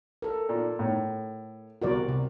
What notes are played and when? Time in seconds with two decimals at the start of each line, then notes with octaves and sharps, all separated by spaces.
0.22 A4 A#4
0.49 A#2
0.79 A2
1.82 C2 B2 F#4 A#4 D5
2.09 C3